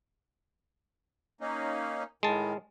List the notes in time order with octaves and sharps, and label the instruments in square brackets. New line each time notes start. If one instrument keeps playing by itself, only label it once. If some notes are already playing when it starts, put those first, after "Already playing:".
[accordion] A#3 C#4 D#4
[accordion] A2 D#3 [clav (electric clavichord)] G#3 A5